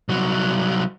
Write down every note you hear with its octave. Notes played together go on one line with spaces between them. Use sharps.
C2 F#3